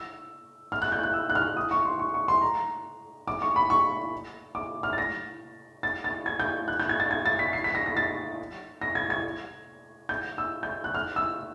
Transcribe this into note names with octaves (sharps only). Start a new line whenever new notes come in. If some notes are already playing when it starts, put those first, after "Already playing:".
Already playing: E6
F6
F#6
G6
F#6
E6
F#6
F6
D#6
C#6
C6
C#6
C#6
C6
A#5
D6
C#6
B5
C#6
D6
F6
A6
A#6
A6
A6
G#6
G6
F#6
G6
G#6
A6
G#6
A6
B6
C7
B6
A#6
A#6
A6
A#6
G#6
G#6
G6
E6
G6
F#6
F6
E6